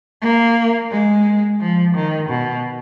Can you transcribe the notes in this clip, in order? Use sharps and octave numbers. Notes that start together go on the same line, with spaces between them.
A#3
G#3
F3
D#3
B2